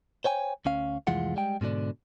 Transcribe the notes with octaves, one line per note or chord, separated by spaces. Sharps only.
C5 C#5 G5 G#5
D2 C#4 F5
C2 F2 E3 G#3 F4 F#5
G3 G#3 G5
G#2 B2 D3 D4